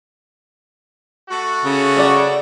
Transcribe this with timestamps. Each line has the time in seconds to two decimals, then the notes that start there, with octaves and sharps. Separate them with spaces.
1.29 A3 F#4
1.65 C#3
1.97 C#5 D5 F#5